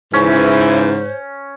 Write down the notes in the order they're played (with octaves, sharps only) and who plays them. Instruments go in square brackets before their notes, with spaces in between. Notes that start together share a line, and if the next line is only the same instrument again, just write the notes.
[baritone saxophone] G#2 [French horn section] C#3 E3 [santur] C#4 [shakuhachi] C5